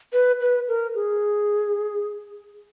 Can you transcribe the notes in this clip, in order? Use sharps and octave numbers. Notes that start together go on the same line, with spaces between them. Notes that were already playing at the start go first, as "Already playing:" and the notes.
B4
B4
A#4
G#4